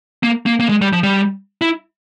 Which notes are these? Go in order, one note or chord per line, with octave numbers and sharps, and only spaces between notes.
A#3
A#3
A#3
G#3
G3
F3
G3
E4